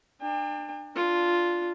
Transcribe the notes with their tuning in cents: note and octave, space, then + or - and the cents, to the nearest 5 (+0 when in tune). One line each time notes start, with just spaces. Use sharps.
D4 +30 G5 +45
D4 +0 F4 +0